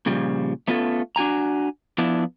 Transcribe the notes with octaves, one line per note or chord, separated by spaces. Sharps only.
A#2 C#3 F3 G3
A3 B3 C#4 F4 F#4 A4
D4 F#4 G#5 A#5
F3 B3 D4 E4